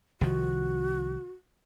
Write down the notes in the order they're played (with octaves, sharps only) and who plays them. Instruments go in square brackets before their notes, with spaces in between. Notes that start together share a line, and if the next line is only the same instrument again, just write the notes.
[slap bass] C2 D#3 F3 [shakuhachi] F#4